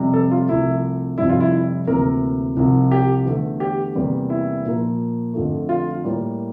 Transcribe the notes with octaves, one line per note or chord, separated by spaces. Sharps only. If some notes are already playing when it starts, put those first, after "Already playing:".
Already playing: F2 C3 G3
A4
F4
C2 C3 F3 A3 E4
F2 C3 G3 E4
F4
E4
E4
D2 C3 E3 A#3 A#4
C2 C3 F3
G4
E2 D3 A3
G4
E2 C3 G3 A#3
E4
A#2 F3 A#3
F2 D3 F3 A3
F4
A2 G3 A#3